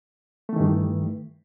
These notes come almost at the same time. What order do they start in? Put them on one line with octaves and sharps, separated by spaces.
A3 E3 D#3 G2